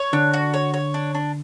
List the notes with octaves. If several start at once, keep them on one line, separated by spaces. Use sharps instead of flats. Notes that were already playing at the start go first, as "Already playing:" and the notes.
Already playing: C#5
D3 D4
F#4
C#5
C#5
D4
D4